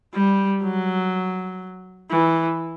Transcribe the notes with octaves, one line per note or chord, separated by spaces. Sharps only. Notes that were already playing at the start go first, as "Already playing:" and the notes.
G3
F#3
E3